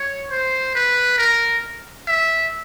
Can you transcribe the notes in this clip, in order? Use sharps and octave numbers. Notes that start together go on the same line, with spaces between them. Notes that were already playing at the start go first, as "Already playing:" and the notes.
Already playing: C#5
C5
B4
A#4
E5